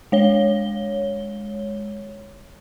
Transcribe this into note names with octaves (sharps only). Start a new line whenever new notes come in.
G#3 C#5 G7